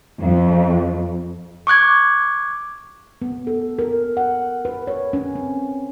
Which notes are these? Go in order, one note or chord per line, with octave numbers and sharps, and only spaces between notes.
F2
C#6 D6 F#6 G#6
B3
A4
A#4
F#5
B4
C#5
C#4
C4